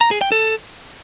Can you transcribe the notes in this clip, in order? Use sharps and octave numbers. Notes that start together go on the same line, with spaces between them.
A#5
G#4
G5
A4